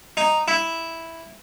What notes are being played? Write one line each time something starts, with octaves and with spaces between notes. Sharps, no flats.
D#4
E4